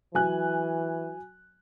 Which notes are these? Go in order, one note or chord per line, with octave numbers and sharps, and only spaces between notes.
E3 F#3 G#5 F#6